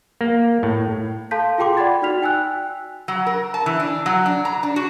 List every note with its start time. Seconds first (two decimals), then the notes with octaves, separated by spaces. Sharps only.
0.21 A#3
0.63 A2
1.31 A4 F5 A5 C6 G6 B6
1.58 F4 G#4 G5 C6 D6
1.77 D5 F#5 G5 B5 G#6 A6
2.02 D#4 F#4 D5 F6 B6 F7
2.22 G5 G#5 E6 F#6
3.08 F#3
3.26 A#4
3.54 A5
3.66 E3
3.80 D4
4.06 F#3
4.26 D4
4.45 A#5
4.63 D4
4.76 F#4